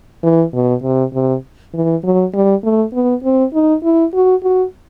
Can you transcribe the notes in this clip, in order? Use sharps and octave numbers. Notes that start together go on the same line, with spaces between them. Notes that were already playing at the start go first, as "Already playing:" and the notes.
E3
B2
C3
C3
E3
F#3
G3
A3
B3
C4
D#4
E4
F#4
F#4